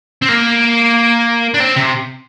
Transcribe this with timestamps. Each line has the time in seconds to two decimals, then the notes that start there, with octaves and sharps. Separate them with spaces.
0.22 C4
0.29 A#3
1.54 D4
1.60 C4
1.76 C3